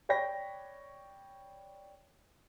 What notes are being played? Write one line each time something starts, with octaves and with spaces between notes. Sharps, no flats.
C#5 D5 G5 B5 A#6 B6